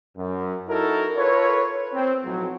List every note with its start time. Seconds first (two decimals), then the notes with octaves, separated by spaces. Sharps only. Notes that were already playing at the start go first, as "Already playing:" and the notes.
0.17 F#2
0.68 D#4 E4 F#4 A4 A#4
1.17 F4 A4 B4 C#5
1.94 C4
2.24 B1 A2 F3 F#3